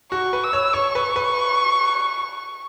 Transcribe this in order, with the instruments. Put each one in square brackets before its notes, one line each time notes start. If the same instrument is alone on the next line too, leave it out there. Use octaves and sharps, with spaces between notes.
[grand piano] F#4 [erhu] C#6
[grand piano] B4
[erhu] E6
[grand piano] C#5
[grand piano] C#5 [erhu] C#6
[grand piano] B4
B4